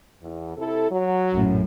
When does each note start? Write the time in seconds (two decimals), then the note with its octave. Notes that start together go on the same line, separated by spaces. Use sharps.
0.22 E2
0.57 C3 E4 A4
0.91 F#3
1.33 A#1 F#2 A2